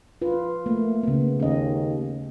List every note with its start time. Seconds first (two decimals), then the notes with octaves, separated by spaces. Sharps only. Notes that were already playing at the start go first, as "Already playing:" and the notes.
0.22 F4 B4
0.66 A3 A#3
1.03 C#3 B3
1.40 D#2 C#4 D#5